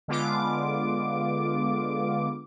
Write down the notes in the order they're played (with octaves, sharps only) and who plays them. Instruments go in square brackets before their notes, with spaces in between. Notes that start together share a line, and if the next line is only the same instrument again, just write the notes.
[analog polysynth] D3 G#3 B3 F4 D6